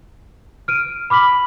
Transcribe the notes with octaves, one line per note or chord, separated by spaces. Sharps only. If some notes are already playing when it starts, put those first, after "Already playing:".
F6 D7 D#7
B5 D6 F6 B6 F#7